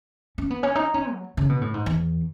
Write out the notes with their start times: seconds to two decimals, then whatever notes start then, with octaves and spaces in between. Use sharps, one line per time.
0.38 C#4
0.50 B3
0.63 C#4
0.75 D#4
0.94 C#4
1.12 F#3
1.37 C#3
1.49 B2
1.61 A2
1.74 G#2
1.86 E2